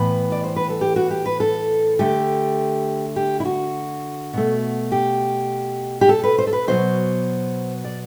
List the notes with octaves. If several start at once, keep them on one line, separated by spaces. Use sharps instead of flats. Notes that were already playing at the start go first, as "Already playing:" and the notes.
Already playing: A2 E3 B3 B4
D5
C5
B4
A4
G4
F#4
G4
B4
A4
D3 A3 G4
G4
E4
F#4
B2 A3
G4
G4
A4
B4
C5
A4
B4
B2 F#3 B3 C5
D5